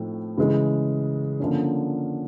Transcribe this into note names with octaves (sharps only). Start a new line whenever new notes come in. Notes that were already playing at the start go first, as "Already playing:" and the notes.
Already playing: A2 F3 A3 C4 D#4
C#3 E3 G#3
D3 F3 A#3 C#4